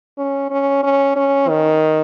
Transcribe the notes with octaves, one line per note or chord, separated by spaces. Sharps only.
C#4
C#4
C#4
C#4
D#3